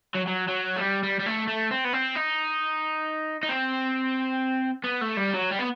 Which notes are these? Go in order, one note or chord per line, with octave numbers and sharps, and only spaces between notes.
F#3
F#3
F#3
A3
G3
G3
G3
A3
A3
C4
B3
C4
D#4
D#4
C4
B3
A3
G3
F#3
G3
B3